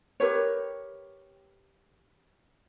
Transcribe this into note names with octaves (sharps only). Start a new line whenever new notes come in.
G4 A#4 B4 C#5